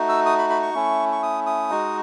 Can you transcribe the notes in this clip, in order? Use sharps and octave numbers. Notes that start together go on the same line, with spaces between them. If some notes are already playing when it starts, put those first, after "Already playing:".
Already playing: A3 D#4 F#4
E6
D#6
B5
B5
C#6
A3 C#4 E4
C#6
D#6
D#6
G#3 D#4 F#4